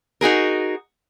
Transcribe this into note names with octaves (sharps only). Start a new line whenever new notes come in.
D#4 F#4 G#4 A#4